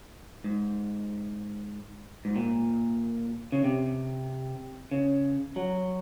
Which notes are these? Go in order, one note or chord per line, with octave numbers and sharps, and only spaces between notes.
G#2
G#2
A#2
C#3
C3
C#3
F#3